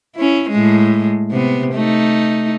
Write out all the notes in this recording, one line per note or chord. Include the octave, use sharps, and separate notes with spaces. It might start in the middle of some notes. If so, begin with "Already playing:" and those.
C#4 E4
A2 G#3
C3 B3
A3 D#4